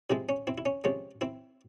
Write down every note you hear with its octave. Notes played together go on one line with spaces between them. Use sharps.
C3 F3 G#3 C4 E4
C#4
C4 E4
E4
C#4
C3 F3 G#3 C#4
C4 E4